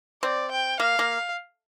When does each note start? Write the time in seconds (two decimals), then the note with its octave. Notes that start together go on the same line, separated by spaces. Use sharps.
0.23 C4 D5
0.51 G5
0.80 A#3 F5
0.99 A#3